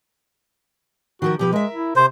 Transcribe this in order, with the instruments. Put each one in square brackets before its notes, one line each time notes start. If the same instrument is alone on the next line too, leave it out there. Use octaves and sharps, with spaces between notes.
[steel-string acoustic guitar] D#3 F3 A#4 [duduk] F#4
[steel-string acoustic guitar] B2 F3 B4 [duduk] G4
[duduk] G#3 [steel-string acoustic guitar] A#4 E5
[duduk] E4
[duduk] C3 [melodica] C5